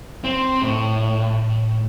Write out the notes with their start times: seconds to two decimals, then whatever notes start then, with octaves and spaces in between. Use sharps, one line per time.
0.24 C4
0.62 A2